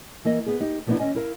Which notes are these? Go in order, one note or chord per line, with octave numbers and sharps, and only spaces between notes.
E3 A#3 A#4 D#5
B3 G#4
D#4 G4
B2 F3 A#3 B3 D4 E4
D#2 F3 C#4 D#5 G#5
E4 A#4 F5